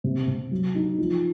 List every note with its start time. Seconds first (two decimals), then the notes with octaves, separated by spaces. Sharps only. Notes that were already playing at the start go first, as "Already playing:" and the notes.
0.04 C3
0.28 C3
0.51 F#3
0.75 D#4
0.99 F3